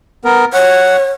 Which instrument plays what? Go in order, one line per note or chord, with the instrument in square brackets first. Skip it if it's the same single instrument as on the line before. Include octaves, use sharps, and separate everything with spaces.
[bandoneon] B3 A#4
[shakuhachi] C#5 [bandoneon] F#5